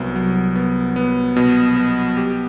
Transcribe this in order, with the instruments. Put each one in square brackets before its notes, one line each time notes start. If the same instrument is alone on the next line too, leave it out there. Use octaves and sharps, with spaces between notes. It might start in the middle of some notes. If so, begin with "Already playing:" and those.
Already playing: [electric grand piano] C2 F#3 B3
F#3
B3
B3
B2
B3
G4